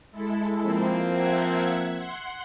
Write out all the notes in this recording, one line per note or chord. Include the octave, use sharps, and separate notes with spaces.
G#3 E4 A4
F3 A#3 C4
E5 F#5 G#6
F#5 C6